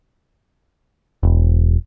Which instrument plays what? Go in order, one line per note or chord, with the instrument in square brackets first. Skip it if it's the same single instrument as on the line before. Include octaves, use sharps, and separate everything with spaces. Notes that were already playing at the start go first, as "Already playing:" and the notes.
[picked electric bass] E1